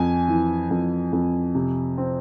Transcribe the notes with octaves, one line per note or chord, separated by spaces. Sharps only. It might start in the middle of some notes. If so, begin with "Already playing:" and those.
Already playing: F2 G#5
E3
F2
F2
C3
C4